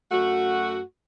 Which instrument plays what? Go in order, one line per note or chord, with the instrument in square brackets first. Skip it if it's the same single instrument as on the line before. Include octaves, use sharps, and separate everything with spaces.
[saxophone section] F#2 A3 F#4